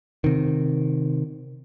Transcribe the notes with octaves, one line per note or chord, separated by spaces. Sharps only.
C3 D#3